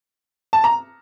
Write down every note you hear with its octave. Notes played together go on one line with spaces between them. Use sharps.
A5
A#5